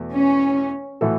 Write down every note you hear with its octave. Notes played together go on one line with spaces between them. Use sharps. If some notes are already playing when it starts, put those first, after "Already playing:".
Already playing: E2 B2 A3
C#4
A2 E3 A3 F#4 A4